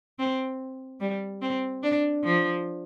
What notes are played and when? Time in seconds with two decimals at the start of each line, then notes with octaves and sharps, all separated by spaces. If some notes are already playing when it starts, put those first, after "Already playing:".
0.19 C4
1.00 G3
1.42 C4
1.83 D4
2.24 F3